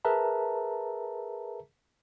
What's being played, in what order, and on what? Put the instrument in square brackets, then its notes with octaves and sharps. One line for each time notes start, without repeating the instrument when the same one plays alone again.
[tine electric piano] G#4 A#4 B4 E5 A5 A#5